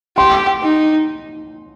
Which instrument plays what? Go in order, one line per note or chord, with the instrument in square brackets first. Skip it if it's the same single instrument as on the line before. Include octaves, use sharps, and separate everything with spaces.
[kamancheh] G4 [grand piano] C6
[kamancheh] D#4